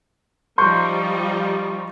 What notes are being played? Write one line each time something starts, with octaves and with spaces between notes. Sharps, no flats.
F3 G3 D#4 C6 C#6 G6